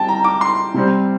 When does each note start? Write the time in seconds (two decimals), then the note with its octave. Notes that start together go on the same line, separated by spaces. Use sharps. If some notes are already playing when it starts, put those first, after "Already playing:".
Already playing: G3 C4 G5 A5
0.08 A#5
0.24 D6
0.41 C6
0.74 C3 G3 C4